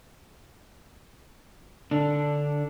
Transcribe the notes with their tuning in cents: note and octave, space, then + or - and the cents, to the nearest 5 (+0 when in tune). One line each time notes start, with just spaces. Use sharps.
D3 +0 D4 -5